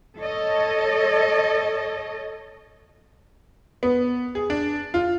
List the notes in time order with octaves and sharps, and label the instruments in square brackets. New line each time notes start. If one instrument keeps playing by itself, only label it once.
[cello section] A4 C#5 D#5
[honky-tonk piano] B3
G#4
D4
F4